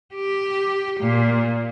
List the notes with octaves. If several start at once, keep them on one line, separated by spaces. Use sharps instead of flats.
G4
A#2